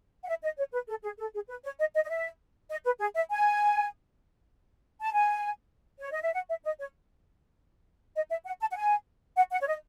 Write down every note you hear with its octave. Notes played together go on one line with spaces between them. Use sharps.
F#5
E5
D#5
C#5
B4
A4
G#4
A4
G#4
B4
C#5
D#5
D#5
D#5
E5
D#5
B4
G#4
E5
G#5
A5
G#5
C#5
D#5
E5
F#5
E5
D#5
C#5
D#5
E5
F#5
A5
F#5
G#5
F#5
F#5
C#5
D#5